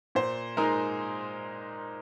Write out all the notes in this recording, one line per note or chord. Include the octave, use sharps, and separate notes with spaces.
A#2 C5
G#3 D#4 A#4